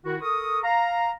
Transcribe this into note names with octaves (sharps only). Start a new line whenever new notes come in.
D#3 E4 F#4
A4 A#4 C#6 D#6
F5 A#5